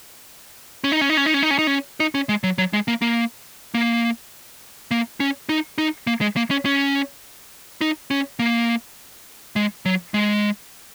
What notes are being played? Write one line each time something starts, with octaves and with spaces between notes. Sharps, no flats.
C#4
D#4
C#4
D#4
C#4
D#4
C#4
D#4
C#4
D#4
C#4
D#4
C#4
G#3
F#3
F#3
G#3
A#3
A#3
A#3
A#3
C#4
D#4
D#4
A#3
G#3
A#3
C#4
C#4
D#4
C#4
A#3
G#3
F#3
G#3